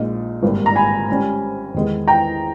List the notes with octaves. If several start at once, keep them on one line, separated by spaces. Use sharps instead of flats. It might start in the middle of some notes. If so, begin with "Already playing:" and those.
Already playing: A#1 A#2 G#3 D#4
G#1 G2 G3 A#3
A#5
G#5 B5
G#2 G3 C#4
E2 D#3 G#3 B3
G5 A#5